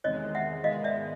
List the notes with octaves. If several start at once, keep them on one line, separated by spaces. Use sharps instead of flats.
E2 C3 D#3 G#3 C#5 D#5
E5 F#5
G#2 D#3 G#3 B3 D#5 F5
D5 E5